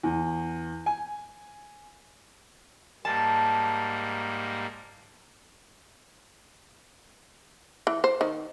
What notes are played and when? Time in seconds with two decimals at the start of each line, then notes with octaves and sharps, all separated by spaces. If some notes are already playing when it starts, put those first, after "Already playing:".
0.04 E2
0.86 G#5
3.05 G#2 G3 A#3 A5
7.87 E3
8.04 C5
8.21 D#3